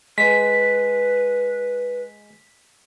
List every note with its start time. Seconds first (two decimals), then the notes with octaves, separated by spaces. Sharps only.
0.18 G#3 B4 B6